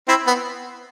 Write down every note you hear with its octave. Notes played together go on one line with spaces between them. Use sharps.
C4 E4
B3